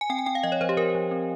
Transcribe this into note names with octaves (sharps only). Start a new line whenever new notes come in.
G#5
C4 G5
G#5
C4 G5
F5
F3 D#5
C#5
F3 C5
G4
F3 A#4
F3
C4